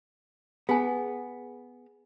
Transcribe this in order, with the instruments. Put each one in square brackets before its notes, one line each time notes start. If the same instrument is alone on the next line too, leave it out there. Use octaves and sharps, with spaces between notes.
[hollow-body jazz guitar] B3 [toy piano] G#4 G#5